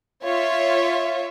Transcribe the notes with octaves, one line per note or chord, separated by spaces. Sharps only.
F4 C#5 E5